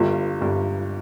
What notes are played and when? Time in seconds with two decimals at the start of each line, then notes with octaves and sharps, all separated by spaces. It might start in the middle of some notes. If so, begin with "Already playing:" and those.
Already playing: G1 G2 G3 F4
0.40 G1 G2 G3